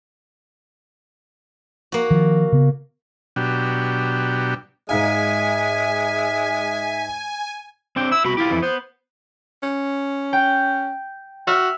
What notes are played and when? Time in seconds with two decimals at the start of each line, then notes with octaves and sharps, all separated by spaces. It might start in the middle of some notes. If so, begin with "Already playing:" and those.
1.92 A#3 F#4
2.11 D#3 F3
2.52 C#3 B3
3.36 B2 F#3 D4 G4
4.89 G#2 G#3 D#4 E5 F5 G#5
7.96 C4 D4 G5
8.11 E4 E6
8.25 C2 B2 F#4 B5
8.37 E4 F4 G4
8.50 F2 E3
8.62 B3 C5
9.63 C#4
10.33 G5
11.47 F#4 E5 F6